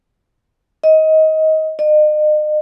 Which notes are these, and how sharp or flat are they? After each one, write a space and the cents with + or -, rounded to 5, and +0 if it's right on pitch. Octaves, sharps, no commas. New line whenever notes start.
D#5 +20
D#5 -40